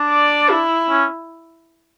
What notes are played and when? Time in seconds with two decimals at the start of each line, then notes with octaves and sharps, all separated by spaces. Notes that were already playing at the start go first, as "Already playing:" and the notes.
Already playing: D4
0.11 D5
0.51 E4
0.90 C#4